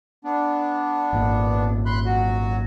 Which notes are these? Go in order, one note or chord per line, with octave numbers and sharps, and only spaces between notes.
B3 D4
G#1 A#2
B5 C6 F#6
F#3 F#4